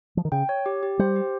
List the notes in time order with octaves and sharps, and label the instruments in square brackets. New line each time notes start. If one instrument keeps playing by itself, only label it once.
[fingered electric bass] F3
D#3
[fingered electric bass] C#3 [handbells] G5
[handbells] C#5
G4
G4
[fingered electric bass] G3 [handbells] C5
[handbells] G4